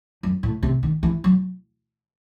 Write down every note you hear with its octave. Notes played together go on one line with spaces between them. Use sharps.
F#2
A2
C3
D#3
E3
F#3